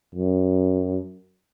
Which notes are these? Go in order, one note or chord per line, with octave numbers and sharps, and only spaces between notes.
F#2